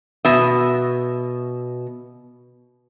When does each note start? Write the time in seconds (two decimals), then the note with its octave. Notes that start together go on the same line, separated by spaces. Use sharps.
0.25 B2 E5